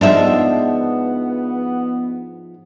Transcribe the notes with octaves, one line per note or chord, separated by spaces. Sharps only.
G#2 F3 G#3 B3 D4 E5